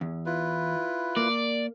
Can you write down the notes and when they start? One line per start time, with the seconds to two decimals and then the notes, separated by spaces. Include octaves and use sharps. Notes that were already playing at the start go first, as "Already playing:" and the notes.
0.01 E2
0.26 E4 F4 B4
1.17 A#3 D5